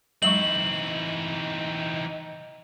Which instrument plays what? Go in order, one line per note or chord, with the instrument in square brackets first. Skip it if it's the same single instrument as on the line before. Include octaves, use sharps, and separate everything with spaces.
[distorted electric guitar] E3 C4 [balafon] F#3 G#3 C#6 [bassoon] D#4 [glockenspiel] F#7